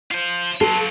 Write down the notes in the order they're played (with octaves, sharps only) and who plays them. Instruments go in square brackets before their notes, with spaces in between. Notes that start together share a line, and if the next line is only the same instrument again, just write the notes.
[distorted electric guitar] F4 C5
[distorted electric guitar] F#3 F4 [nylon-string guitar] A4